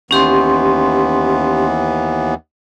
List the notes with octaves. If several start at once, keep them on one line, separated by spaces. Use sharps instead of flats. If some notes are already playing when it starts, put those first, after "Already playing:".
D#2 E3 B3 C#4 G4 C6